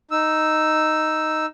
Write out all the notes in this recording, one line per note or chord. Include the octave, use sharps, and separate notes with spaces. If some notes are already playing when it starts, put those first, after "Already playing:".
D#4 E6